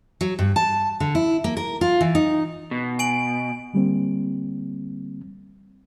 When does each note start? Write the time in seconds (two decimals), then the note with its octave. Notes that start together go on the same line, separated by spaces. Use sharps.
0.21 F#3
0.39 G2
0.56 A5
1.00 D3
1.15 E4
1.44 A#3
1.57 A#4
1.81 F4
2.01 E3
2.15 D#4
2.71 B2
2.99 G#5 D7 F#7
3.74 D3 G3 A#3 C4